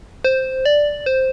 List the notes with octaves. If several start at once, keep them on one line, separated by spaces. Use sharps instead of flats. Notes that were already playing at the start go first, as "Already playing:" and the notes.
C5
D5
C5